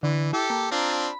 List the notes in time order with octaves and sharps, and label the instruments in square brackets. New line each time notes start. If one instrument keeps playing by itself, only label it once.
[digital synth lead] D3 [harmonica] E3
[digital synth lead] E4 [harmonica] G4 A4
[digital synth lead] A#3
[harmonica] C4 D4 F4 [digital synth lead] A#5
[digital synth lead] B5